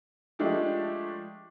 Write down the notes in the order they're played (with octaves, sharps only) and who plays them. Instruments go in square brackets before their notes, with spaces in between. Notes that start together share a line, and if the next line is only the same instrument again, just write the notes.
[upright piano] F3 G#3 A3 D4 G4